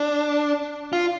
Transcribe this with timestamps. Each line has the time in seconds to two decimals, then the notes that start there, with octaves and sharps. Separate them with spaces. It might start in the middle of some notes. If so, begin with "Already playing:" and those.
Already playing: D4
0.93 F4